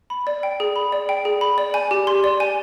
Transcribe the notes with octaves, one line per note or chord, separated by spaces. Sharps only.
B5
D5
G5
G#4
B5
D5
G5
G#4
B5
D5
G#5
G4
C6
D5
G#5